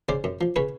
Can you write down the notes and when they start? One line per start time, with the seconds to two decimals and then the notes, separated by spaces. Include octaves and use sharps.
0.09 C#3 C5 D5
0.24 F#2
0.41 F3
0.56 C#3 B4 C#5